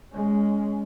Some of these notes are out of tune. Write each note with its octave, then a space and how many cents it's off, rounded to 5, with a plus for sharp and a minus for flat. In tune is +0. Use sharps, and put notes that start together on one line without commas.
G#3 +0 C#4 +15